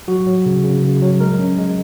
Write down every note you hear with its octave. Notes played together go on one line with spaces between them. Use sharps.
F#3 F#4
F#3
C#3
C#3
C#3
F#3
G#3 A#4
C#4
G#3